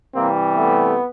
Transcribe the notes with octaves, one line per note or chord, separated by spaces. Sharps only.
C3 E3 G3 A#3 C4
A3 B3